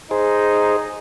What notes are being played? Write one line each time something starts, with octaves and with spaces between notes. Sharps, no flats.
D#4 G#4 C5